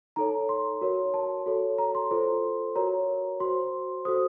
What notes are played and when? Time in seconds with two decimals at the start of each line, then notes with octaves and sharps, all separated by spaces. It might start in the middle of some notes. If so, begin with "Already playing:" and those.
0.16 D#4 A4 C#5 A#5
0.49 C6
0.81 F#4 A#4 C#5
1.14 A5
1.46 F#4 A4 C#5
1.78 A#5
1.95 C6
2.11 F4 A4 C5
2.75 F#4 A#4 C#5 A#5
3.40 F#4 C5 C6
4.05 F#4 A4 C5 D#6